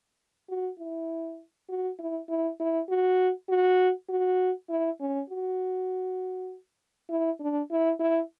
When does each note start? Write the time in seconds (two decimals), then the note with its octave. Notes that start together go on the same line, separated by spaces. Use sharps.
0.49 F#4
0.79 E4
1.69 F#4
1.99 E4
2.29 E4
2.60 E4
2.89 F#4
3.49 F#4
4.09 F#4
4.69 E4
5.00 C#4
5.29 F#4
7.09 E4
7.40 D4
7.71 E4
8.00 E4